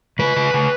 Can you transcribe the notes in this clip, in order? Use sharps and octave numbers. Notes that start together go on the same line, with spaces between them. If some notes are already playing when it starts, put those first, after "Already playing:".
C#3 B4
C#3
C#3